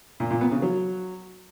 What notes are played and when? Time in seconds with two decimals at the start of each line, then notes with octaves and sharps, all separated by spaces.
0.20 A#2
0.30 A#2
0.41 B3
0.52 C#3
0.62 F#3